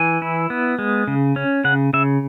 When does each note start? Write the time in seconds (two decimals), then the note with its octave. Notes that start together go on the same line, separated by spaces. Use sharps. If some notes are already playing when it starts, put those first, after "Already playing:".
Already playing: E3 G#5
0.22 E4
0.50 B3
0.79 G#3
1.07 C#3
1.36 C#4
1.64 C#3 F#5
1.93 C#3 E5